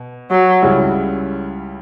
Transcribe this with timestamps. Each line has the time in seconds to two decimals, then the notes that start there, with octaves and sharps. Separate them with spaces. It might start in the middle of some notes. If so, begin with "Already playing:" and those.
Already playing: B2
0.31 F#3
0.62 C#2 C#3 G3 C#4 E4